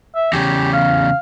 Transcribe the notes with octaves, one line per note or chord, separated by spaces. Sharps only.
E5
E2 C#3 G4
F5